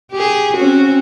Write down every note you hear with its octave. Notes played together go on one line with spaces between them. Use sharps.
G4 G#4
C4 C#4 F#4